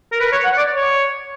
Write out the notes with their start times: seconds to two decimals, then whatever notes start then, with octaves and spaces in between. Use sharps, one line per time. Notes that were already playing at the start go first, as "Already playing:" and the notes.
0.12 A#4
0.20 B4
0.32 C#5
0.44 F#5
0.57 D5
0.76 C#5